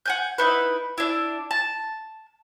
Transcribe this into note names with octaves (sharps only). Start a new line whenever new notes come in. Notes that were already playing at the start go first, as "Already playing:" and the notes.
F#5 G#5 G6
D#4 E4 B4
D4 E4
A5